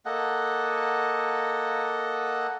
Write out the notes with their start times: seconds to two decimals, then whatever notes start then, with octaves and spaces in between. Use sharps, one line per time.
0.06 A#3 A4 D#5 F#5